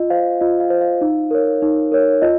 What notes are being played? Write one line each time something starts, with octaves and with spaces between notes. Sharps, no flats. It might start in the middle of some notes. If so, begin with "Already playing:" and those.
Already playing: F4 D#5
C5 F5
F4 D#5
F5
C5
F5
D#4
A#4 C#5
D#4
A#4 C#5
F4 D#5